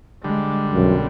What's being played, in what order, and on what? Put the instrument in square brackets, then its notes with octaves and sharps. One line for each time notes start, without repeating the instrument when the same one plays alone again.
[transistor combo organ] D3 G3 [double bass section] G#3
[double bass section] B1 [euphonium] F#2